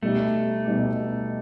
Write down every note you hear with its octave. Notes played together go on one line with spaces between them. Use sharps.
B2 G3 A3 D#4 G4
B2 G3 D#4 G4